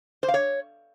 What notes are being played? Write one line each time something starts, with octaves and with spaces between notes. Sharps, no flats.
C5
F5
C#5